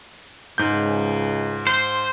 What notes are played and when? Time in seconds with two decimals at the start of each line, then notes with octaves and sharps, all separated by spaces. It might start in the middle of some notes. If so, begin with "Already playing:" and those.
0.58 C#2 G#2 G6
1.67 C5